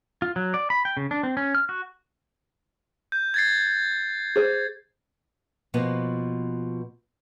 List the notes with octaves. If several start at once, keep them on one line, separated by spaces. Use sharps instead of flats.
F4
F#3
D5
B5
G5
C#3
D4
C4
C#4
F6
F#4
G6
G#6 A6 C7
G#4 C5
B2 F3 A#3 B3